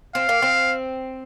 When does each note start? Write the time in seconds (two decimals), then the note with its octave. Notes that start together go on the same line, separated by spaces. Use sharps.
0.15 C4 F5
0.29 A#3
0.42 C4